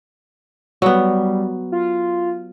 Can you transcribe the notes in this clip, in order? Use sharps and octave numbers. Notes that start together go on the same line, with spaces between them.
F#3 G3 B3
F4